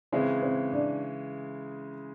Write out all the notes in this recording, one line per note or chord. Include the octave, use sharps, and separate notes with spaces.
C#3 E3 G#3 C4 C5
C4 C5
D4 D5